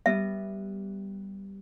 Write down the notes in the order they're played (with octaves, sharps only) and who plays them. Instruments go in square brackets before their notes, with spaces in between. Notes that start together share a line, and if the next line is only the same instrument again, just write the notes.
[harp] G3 B3 [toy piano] E5